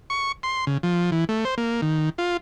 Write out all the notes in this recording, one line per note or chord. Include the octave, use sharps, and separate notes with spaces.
C#6
C6
C#3
F3
E3
A3
C5
A#3
D#3
F4